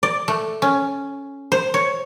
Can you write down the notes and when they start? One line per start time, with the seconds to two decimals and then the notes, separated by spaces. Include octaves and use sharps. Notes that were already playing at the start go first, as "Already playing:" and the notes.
0.03 D5
0.28 A3
0.62 C#4
1.52 C5
1.74 C#5